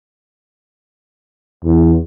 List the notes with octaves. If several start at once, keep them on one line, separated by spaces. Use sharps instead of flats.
E2